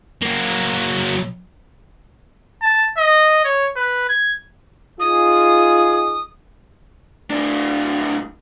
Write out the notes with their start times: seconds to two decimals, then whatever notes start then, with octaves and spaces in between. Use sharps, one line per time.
0.22 F#3 A#3
2.62 A5
2.98 D#5
3.45 C#5
3.76 B4
4.09 G#6
5.00 D#4 F4 G#4 D#6
7.30 A2 D4